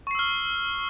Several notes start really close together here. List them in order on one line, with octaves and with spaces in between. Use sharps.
C#6 C7 E6 F6